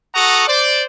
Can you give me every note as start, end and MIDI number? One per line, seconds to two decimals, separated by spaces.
0.15 0.45 66
0.15 0.45 69
0.15 0.45 78
0.15 0.45 82
0.15 0.45 85
0.15 0.45 87
0.48 0.83 72
0.48 0.83 74